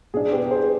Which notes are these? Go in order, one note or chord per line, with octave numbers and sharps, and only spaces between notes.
B2 B3 D4 G#4
G4 B4
G#4 C5